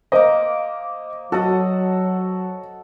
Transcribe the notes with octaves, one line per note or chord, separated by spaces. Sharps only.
A#3 C5 D#5 D6
F#3 F#4 A4 D#5 F#5